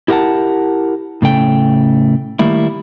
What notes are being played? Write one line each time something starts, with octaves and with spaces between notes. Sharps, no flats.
E4 G4 A#4 E5 F#5 A5
A2 C#3 A3 G5
D#3 G3 A3 A#3 E4